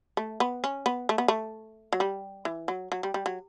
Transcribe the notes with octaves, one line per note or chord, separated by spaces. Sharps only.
A3
B3
C#4
B3
A3
B3
A3
F#3
G3
E3
F#3
F#3
G3
G3
F#3